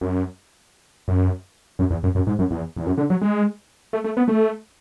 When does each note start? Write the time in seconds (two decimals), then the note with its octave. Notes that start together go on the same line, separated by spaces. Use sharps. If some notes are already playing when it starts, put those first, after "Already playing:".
0.01 F#2
1.08 F#2
1.79 F#2
1.90 E2
2.03 F#2
2.15 F#2
2.27 G#2
2.39 F#2
2.51 E2
2.77 E2
2.86 F#2
2.98 D3
3.10 F#3
3.22 G#3
3.93 A3
4.04 A3
4.17 B3
4.28 A3